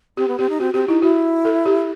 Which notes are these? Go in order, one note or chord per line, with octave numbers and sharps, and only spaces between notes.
C4 G4
B3
C4 G4
D#4
C4 F#4
C4 G4
D#4 E4
E4 F#4
A4
G4